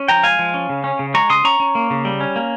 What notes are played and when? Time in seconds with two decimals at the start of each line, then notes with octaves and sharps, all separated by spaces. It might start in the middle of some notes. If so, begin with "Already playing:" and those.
Already playing: C#4
0.08 F3 G5 A#5
0.23 G#3 F5 G#5
0.39 F3
0.54 C#4
0.69 C#3
0.84 C#4
0.99 C#3
1.14 G#3 A#5 C#6
1.29 C#3 C6 D#6
1.44 C#4 A#5 C#6
1.60 C#4
1.75 A#3
1.90 C#3
2.05 G3
2.21 C#4
2.36 A#3